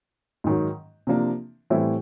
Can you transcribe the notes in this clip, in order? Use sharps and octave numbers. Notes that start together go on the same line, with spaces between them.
G#2 D#3 F#3
C3 F3 A#3 D4
A2 E3 G3 C4 E4